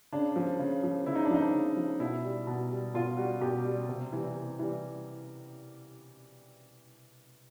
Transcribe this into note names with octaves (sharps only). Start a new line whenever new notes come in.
C#3 D4
F3
C#3
F3
C#3 E4
D#4
D4
F3 D#4
C#3
F3
B2 E4
G3
B2
G3
B2 F4
G3 F#4
B2 G4
G3
C3
E3 G3
C3
E3 G3